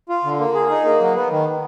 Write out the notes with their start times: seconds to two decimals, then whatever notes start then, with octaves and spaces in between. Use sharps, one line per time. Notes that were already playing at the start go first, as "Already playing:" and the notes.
0.09 F4
0.24 D3
0.39 A#3
0.54 G#4
0.70 D#4
0.84 A#3
1.00 F#3
1.14 B3
1.31 D#3